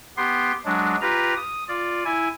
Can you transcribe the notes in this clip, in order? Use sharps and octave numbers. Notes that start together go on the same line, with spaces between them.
B3 G4 C6
F#3 G#3 D4
F4 G4 B4 A#5
D#6
F4 D5
E4 G#5